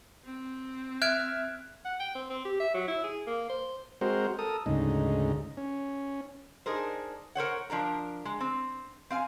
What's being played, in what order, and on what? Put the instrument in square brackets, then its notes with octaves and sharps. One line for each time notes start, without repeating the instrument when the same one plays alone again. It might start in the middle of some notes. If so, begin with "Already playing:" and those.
[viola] C4
[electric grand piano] E5 F6 [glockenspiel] F#6 G#6 D7
[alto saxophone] F#5
G5
C4
C4
G4
E5
F#3
E4
G#4
A#3
C5
[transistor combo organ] G#3 C4 F#4 A#4 C5
A4 A#4 D#6
D2 G#2 C#3 D#4
C#4
[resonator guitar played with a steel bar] D4 D#4 G#4 A#4 C5
A#4 C5 C#5 F#5
F3 D4 A#4 A#5
G#3
C4
C4 F5 G#5